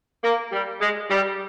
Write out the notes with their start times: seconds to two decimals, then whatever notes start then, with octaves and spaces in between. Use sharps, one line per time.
0.24 A#3
0.52 G3
0.81 G#3
1.10 G3